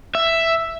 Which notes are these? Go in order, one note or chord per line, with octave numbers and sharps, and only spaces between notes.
E5